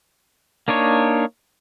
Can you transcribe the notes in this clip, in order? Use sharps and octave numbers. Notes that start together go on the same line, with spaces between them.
A#3 D4 D#4 C#5